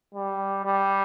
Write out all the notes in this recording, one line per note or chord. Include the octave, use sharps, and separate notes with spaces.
G3
G3